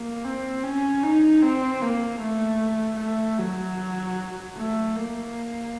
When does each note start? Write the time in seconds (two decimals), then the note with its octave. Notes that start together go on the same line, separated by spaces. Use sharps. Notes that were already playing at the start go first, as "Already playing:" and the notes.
Already playing: A#3
0.24 C4
0.64 C#4
1.03 D#4
1.43 C4
1.82 A#3
2.21 A3
3.00 A3
3.39 F#3
4.57 A3
4.97 A#3